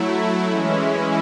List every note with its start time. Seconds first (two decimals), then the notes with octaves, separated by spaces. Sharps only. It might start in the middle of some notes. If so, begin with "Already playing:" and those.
Already playing: F#3 A3 E4
0.47 E3 G#3 C#4 E4